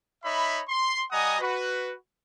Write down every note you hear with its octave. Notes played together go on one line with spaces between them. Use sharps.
D#4 C#5 E5 B5
C6
G3 D#5 F#5 G#5 A#5 D#6
F#4 B4